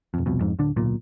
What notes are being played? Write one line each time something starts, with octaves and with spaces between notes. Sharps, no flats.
E1 F2
C2 F2 B2
F2 G#2
D1 D3 D4
D1 B1 A#2